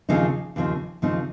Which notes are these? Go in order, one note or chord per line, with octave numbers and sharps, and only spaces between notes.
D#2 C#3 F3 C4 D#4
D#2 C#3 F3 C4 D#4
D#2 C#3 F3 C4 D#4